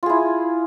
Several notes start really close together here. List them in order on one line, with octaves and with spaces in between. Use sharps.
F4 G#4 E4